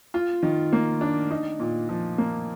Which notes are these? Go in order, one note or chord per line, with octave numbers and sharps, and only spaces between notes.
F4
D#3
A#3
D4
D#4
A#2
F3
A#3